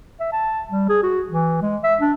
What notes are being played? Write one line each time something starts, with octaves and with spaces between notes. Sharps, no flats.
E5
A5
G3
G#4
F#4
E3
G#3
E5
D4